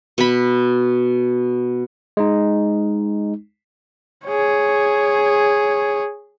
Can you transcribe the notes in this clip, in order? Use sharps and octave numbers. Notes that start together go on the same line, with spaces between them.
B2 B5
G#3 D#4
G#4 C#5